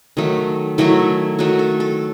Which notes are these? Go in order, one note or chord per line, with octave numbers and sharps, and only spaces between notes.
D#3 F#3 A3
D#3 F#3 A3 E4
D#3 F#3 A3 F#4
A4
A4